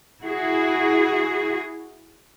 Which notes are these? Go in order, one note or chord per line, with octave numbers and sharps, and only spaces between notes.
E4 F#4 G#4